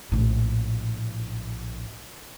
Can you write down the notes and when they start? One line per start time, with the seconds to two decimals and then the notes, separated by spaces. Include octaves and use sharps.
0.12 A#1 A2